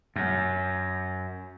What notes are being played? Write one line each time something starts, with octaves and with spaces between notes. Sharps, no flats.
F#2